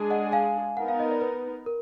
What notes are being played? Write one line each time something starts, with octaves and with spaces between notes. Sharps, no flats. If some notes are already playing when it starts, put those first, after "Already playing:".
Already playing: G#3 D4 G#4
D#5 F#5
F5 G#5
B3 D#4 A#4 F#5
F5
D#5
D5
B4
A#4